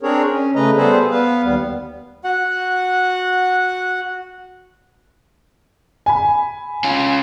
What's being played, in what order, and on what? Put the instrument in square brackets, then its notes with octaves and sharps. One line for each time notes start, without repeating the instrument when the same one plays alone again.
[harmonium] C4 D4 G#4 A#4 C#5
C#4
C#3 A3 B4 D#5 A#5
G3 B3 G#4 A4 B4 C5
B3 B4 F5
D#2 G3 B3
[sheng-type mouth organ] F#4 F#5
[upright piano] G#5 B5
[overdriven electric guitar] C#4 F4